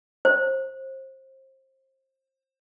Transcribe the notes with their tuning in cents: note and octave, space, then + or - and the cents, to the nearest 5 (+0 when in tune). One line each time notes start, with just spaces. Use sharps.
C5 +25